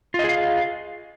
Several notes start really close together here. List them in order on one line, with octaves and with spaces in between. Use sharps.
F4 D#5 G#4 F5